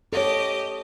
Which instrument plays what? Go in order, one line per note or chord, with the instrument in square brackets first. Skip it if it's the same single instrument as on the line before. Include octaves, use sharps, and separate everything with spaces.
[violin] G4 D#5 [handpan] A4 C#5